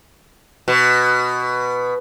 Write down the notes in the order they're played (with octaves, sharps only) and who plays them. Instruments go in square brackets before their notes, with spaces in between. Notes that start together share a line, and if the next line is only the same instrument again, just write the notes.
[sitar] B2